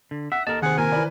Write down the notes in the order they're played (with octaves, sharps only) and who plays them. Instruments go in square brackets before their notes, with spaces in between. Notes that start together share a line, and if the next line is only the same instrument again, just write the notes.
[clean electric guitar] D3
[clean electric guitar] E5 [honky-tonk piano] F#5
[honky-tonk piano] D#2 [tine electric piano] A4 D#5 [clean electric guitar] A#4 A5
[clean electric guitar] C3 [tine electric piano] D#3 C5 [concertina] G#4 F#5
[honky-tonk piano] A#2 [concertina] A#4 G#5
[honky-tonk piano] E3 B4 D5